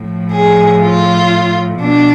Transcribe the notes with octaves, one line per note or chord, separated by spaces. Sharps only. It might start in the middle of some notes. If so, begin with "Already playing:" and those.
Already playing: A2 F3
G#4
F4
B2 D4